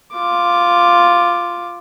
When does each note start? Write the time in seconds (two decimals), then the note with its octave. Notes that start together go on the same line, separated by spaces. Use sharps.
0.13 F4 D6